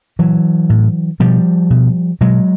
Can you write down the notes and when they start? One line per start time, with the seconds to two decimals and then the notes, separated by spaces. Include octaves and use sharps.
0.19 A#2 E3 F#3
0.70 A2
1.20 B2 F3 G3
1.70 B2
2.21 B2 F#3 G#3